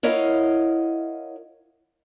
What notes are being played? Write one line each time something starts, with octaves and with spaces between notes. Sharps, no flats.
E4 A#4 C#5 D#5 F5 F#5